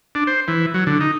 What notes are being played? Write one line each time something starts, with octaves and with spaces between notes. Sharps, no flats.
D4
C5
E3
F#3
D3
D#4